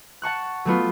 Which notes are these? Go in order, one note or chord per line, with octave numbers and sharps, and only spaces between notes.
F#5 A5 C#6 F#6
F#3 A3 B3 F4